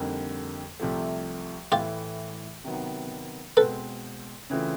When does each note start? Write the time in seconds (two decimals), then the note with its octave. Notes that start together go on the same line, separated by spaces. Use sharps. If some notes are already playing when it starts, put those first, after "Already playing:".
Already playing: F2 D3 G3 A#3 D#4
0.79 C2 C3 F3 A3
1.72 A2 E3 A3 F4 G4
2.64 C3 D#3 F#3 B3
3.57 B2 G#3 C4 A4 B4
4.50 C#3 E3 A3 C4 F4